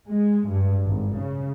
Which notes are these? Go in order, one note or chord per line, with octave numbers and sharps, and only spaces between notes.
G#3
G2
G#1
C#3